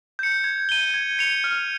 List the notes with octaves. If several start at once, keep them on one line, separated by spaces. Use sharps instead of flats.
G6 C#7
G#6
D#7 G7
G#6
C#7 F7
F6